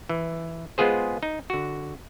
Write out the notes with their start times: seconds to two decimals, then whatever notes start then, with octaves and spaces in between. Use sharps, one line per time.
0.09 E3
0.78 G#3 B3 F4 G#4 C5
1.23 D#4
1.50 D3 F#4